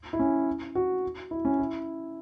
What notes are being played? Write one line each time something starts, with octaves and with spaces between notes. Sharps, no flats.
E4
C#4
F#4
E4
C#4
E4